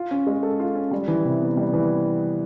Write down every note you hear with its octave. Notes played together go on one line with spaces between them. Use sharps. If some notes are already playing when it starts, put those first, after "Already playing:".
Already playing: F4
C#4
G#3
A4
F4
C#4
G3
E3
C3
B3
G3
E3